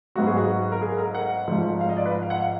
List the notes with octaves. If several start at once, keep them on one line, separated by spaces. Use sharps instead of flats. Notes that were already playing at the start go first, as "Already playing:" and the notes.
G#1 G#2 F#3 B3 F#4
G#4
F#4
A#4
G#4
A#4
F#5
G#1 G#2 F3
F5
D#5
D5
B4
F5
F#5
F5